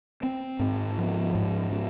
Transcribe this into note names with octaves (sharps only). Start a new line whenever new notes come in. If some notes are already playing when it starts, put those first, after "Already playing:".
C4
G#2
F3
G#2
F3